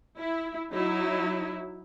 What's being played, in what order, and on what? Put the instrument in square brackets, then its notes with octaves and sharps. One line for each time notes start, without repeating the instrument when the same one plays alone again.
[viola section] E4
F#3 D#4 E4